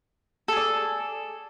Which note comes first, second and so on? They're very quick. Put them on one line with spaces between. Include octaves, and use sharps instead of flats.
A4 G#4 D5